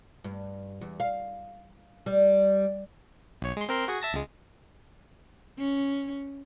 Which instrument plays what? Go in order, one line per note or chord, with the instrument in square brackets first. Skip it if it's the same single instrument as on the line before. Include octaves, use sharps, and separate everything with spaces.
[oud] G2
E2
F5
G3
[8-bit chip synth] B1 C#5
G#3 C6
C4 A#4 C6
F#4 G#4 C#6
E5 A5 A#6
C#2 G#3
[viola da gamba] C#4